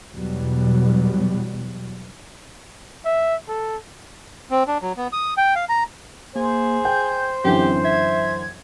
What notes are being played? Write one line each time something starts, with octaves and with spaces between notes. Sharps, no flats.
E2 B2 F#3 G3
E5
A4
C4
D4
F#3
B3
D#6
G5
F5
A#5
A#3 G#4 C5
G5 G6
F#2 D3 E3 C4 G4
E5 G#6